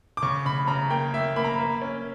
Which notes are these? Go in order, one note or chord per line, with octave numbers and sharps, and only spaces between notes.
D6
C#3 C#6
C#3 B5
C#3 A#5
A#3 G5
A#3 E5
A#3 B5
A#5
B5
A#3
C#4